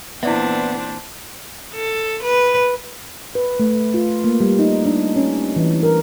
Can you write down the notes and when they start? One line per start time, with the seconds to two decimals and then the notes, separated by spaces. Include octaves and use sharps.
0.23 A#2 E3 B3 C4 D4 E4 D5 E5
1.74 A4
2.23 B4
3.35 B4
3.60 A3
3.94 F4
4.24 A#3
4.40 G3
4.59 D#4
4.85 D4
5.16 C#4
5.56 E3
5.83 A#4